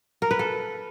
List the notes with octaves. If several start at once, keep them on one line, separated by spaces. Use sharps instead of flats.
A#4
B4
A4